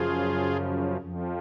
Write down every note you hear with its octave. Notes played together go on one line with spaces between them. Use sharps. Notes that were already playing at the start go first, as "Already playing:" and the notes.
Already playing: F#2 C#3 F3 F4 G#4
F2 F3